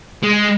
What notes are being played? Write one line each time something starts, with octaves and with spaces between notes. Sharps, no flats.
G#3